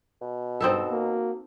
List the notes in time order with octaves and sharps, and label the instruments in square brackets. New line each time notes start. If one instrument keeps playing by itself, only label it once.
[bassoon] B2
[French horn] G2 [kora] C4 D#4 A4
[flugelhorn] A#3 [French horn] F#4